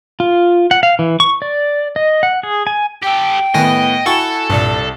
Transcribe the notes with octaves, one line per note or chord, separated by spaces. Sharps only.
F4
F#5
F5
E3
C#6
D5
D#5
F#5
G#4
G#5
G4 A4 G5
A2 D#3 B3 D#5 G#5 A#6
E4 F#4 A4 F#5 G#5 C#6 A6
C2 G2 A#2 D5